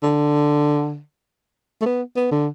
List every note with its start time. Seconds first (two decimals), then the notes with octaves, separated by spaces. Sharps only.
0.03 D3
1.81 A3
1.86 B3
2.16 B3
2.31 D3